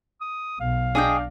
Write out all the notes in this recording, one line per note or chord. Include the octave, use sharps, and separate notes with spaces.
D#6
B1 F5
D4 G#4 D#5 G5